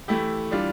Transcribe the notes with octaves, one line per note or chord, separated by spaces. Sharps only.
E3 A3 E4 G4
E3 G3 D4 F4